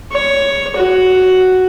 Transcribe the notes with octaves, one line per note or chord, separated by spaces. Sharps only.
C#5
F#4